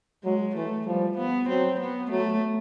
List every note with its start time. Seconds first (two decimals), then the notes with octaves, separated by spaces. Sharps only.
0.24 F#3 G#3
0.56 E3 A3
0.87 F3 G3
1.18 B3
1.48 F#3 C4
1.80 B3
2.11 F#3 A3